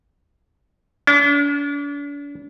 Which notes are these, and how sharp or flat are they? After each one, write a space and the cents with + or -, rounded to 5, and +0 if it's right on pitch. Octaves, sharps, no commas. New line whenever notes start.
D4 -40